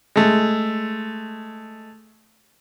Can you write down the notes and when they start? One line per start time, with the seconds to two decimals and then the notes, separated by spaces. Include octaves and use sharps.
0.16 G#3 A3